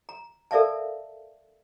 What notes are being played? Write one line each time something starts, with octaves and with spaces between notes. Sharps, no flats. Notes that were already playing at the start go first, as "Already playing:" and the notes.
A#5
A4 A#4 D5 E5 F5 A5